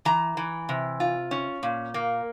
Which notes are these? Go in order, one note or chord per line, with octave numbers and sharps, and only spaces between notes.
E3 A#5
E3
C3
F4
C#4
A#2
A#3